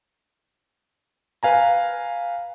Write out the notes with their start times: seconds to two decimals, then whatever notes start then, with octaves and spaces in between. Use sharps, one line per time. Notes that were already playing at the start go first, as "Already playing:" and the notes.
1.43 B4 F5 G#5 A#5